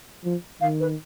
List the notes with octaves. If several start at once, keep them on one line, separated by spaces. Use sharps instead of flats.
F3
D#3 F5
B4